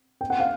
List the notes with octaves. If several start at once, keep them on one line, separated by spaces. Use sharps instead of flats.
G5
F#5
F5